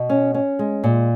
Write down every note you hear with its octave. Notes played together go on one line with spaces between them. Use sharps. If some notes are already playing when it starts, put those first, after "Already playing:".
Already playing: B2
C#4
C#4
G#3
A#2